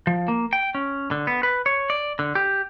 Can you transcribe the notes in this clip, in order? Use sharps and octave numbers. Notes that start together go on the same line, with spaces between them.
F3
A#3
G5
C#4
D3
B3
B4
C#5
D5
D3
G4